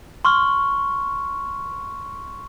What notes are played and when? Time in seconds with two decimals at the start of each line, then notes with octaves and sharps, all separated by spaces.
0.25 C6 C#6 F6